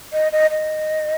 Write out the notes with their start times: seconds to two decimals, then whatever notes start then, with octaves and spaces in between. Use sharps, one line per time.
0.13 D#5
0.32 D#5
0.51 D#5